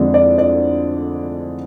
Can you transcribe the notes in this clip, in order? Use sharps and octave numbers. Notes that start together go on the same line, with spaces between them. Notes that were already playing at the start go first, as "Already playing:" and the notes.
Already playing: F2 D3 G#3 D5
D5
D5